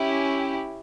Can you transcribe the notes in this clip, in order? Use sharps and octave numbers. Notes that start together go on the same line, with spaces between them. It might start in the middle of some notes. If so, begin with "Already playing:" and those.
Already playing: C#4 E4 G4